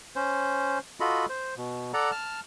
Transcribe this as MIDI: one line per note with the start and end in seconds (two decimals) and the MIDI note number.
0.16 0.79 61
0.16 0.79 72
1.00 1.26 65
1.00 1.26 66
1.00 1.26 69
1.00 1.26 75
1.00 1.26 83
1.29 1.54 72
1.57 1.92 47
1.94 2.11 69
1.94 2.11 74
1.94 2.11 78
1.94 2.11 82
2.12 2.40 81
2.12 2.40 89